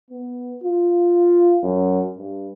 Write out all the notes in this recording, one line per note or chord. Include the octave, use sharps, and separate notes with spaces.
B3
F4
F#2
G2